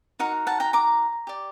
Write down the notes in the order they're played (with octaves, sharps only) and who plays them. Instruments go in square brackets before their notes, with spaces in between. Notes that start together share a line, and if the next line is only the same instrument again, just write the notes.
[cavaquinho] D#4 F#4 A#4 F#5
F#5 A5
G5 A#5
A#5 D6
G4 D5